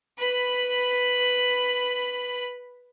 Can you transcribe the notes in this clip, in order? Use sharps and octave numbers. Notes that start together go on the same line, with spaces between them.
B4 B5